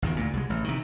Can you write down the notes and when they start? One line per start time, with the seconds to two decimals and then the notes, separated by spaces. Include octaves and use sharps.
0.02 G#1 E2 D#3
0.16 D2 A#2
0.33 C2 G#3
0.50 A1
0.64 C3 D#3